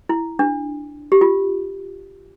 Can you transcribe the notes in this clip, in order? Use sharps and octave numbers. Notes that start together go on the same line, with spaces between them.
E4
D4
G4
F4